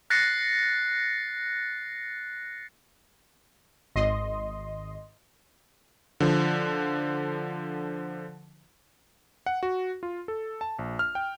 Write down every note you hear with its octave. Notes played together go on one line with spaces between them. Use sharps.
F#6 A6 A#6 C7 C#7
G#1 D#5 C6
D3 F3
F#5
F#4
F4
A4
A5
A#1
F6
G5